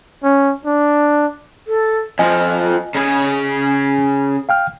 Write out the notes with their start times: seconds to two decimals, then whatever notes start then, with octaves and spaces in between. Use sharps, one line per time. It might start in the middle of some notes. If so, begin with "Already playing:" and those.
0.24 C#4
0.65 D4
1.67 A4
2.19 F2 F3 D#5 G#5
2.95 C#3 G#4
4.49 F5 G5 F6